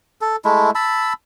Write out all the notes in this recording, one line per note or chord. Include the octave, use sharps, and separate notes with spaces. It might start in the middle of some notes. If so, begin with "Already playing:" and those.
A4
G#3 A3 E4
A5 B5 E6